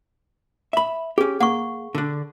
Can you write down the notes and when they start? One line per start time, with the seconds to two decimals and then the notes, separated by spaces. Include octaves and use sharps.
0.73 E5 B5
1.18 C#4 G4 G#4
1.40 A#3 F#5 C#6
1.95 D3 D4